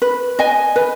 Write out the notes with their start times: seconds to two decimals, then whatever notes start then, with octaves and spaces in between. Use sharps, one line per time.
0.02 B4
0.39 D#5 G#5
0.76 B4